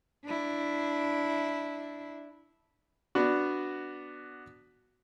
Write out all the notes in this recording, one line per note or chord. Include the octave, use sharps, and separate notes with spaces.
D4 E4
B3 D4 F#4